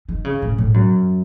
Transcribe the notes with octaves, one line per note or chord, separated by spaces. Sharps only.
D#3
C#3
A2
A2
F#2